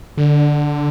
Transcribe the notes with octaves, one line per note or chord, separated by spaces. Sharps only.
D3